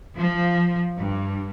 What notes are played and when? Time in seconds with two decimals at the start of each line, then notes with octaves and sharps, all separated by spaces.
0.15 F3
0.98 G2